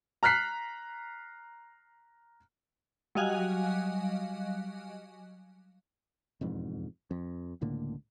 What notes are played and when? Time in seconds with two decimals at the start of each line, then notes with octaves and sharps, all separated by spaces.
0.23 A#5 F6 F#6 B6 C7
3.15 F#3 G3 D#5 F5 G#5 F#6
6.41 E1 F2 G#2
7.11 F2
7.61 C#2 A2 D3 A#3